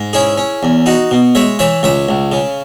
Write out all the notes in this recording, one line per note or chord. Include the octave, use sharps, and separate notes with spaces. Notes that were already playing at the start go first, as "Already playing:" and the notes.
Already playing: G#2
C#4 E4 G#4
C#4
E2
D#4 F#4
B2
G#3 C#5 E5
E3 C#5 E5
C#2 C#5 E5
C#2
C#3